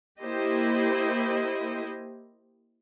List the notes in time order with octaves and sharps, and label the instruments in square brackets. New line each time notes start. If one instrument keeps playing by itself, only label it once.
[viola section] A#3 E4 G4 C5 D#5